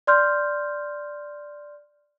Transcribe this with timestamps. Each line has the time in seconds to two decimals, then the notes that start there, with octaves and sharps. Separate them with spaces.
0.07 D5 C6 F6 G6